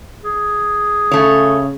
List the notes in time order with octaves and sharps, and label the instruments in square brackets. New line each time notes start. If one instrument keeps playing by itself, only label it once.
[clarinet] G#4
[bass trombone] C#3 [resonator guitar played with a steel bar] A3 C#5